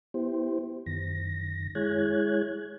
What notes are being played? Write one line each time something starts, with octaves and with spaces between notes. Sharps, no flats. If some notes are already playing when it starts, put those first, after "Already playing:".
B3 E4 G4 C5
F#2 D#3 A#6
G#3 E4 G#4 C#5 F#6 G#6